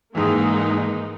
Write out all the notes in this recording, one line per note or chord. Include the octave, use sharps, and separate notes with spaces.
G#2 D#3 E3 G#3 A#3 D#4